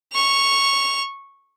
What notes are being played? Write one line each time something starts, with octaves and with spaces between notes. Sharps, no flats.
C#6 F7